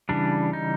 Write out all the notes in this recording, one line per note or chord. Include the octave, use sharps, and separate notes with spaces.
C#3 E3 G3 D4
D#4